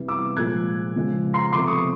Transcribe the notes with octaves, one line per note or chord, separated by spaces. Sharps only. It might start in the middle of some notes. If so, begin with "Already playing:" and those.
Already playing: C3 E3 G3
D6 E6
A#2 F3 G#3 F#6 G#6
C#3 F3 G#3
A#5 C6
C3 F3 A3 C6 D6
C#6 D#6